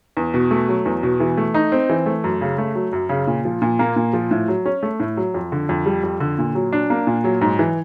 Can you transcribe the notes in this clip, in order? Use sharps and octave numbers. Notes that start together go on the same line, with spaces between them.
E2
B2
A3
F#3
E2
B2
E3
A3
D#4
C4
E3
A3
F#2
C#3
A3
F#3
F#2
C#3
A#2
F3
A#2
A#3
A#2
F3
A2
F#3
C#4
A3
A2
F#3
F2
D3
F2
G3
F2
D3
A#2
F#3
D4
A#3
A#2
F#3
G#2
E3